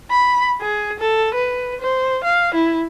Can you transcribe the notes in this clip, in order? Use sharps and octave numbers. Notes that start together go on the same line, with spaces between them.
B5
G#4
A4
B4
C5
F5
E4